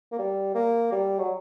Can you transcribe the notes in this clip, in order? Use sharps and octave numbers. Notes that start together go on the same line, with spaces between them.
A#3
G3
A#3
G3
F#3